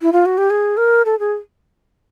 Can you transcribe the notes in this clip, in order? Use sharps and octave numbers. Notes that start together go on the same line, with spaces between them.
E4
F4
F#4
G4
G#4
A#4
A4
G#4